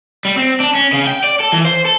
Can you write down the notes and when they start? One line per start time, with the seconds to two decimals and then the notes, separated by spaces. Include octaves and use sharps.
0.25 G3
0.37 C4
0.60 D4
0.75 C#4
0.93 C#3
1.07 G5
1.24 D5
1.40 A4
1.52 E3
1.65 C5
1.85 A4